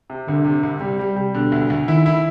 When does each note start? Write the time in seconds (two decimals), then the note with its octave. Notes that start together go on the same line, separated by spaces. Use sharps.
0.10 C3
0.28 C2 D3
0.45 C3
0.63 C2
0.81 C3 G3
0.99 G3
1.16 G3
1.34 B2 D3
1.52 D2
1.70 D2
1.88 D#3 E4
2.06 E4